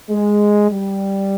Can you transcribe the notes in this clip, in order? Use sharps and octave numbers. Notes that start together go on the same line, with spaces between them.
G#3
G3